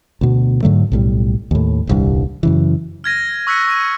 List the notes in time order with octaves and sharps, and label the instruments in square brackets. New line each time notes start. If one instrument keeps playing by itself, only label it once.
[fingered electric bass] D2 B2
G#2 D3 F#3 A3
B1 A2 G3
D#2 A2
D#1 C2 G2
F#2 C#3 E3
[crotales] F6 G#6 A#6 D#7
C#6 E6 F#6 B6 C#7
C#6 D#7